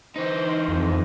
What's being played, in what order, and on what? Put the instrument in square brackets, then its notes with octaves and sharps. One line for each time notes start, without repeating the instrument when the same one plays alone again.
[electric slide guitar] E3 D#4 [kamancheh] C5
[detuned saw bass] F2